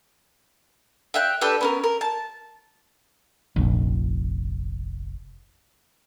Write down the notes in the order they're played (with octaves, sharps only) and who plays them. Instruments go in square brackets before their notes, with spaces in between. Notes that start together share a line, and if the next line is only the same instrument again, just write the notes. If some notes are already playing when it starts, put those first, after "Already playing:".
[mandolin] E5 F5 G5 F#6
D4 G4 A4 B4
B3 C#4 A#4
A#4
A5
[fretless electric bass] F1 A#1